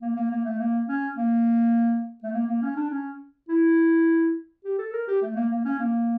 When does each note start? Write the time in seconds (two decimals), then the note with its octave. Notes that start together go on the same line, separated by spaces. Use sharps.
0.02 A#3
0.16 A#3
0.31 A#3
0.45 A3
0.59 A#3
0.88 C#4
1.17 A#3
2.23 A3
2.33 A#3
2.47 A#3
2.62 C#4
2.76 D4
2.90 C#4
3.49 E4
4.64 G4
4.78 A4
4.93 A#4
5.08 G4
5.22 A3
5.36 A#3
5.51 A#3
5.65 C#4
5.79 A#3